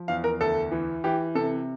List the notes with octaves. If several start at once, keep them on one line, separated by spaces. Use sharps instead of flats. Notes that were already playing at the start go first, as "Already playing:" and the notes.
Already playing: F3
E2 F5
A#4
D2 A4
E3
E3 G4
C3 A4